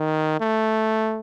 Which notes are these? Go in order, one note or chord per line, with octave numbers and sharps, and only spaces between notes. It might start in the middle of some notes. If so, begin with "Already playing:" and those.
Already playing: D#3
A3